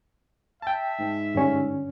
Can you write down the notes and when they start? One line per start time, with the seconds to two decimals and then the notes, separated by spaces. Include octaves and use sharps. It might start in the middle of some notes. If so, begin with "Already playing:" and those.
0.62 E5 G5 A5
0.99 G#2
1.35 G2 D3 C#4